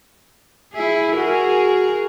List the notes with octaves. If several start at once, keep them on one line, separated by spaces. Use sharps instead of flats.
E4 G#4
F#4 G#4 A#4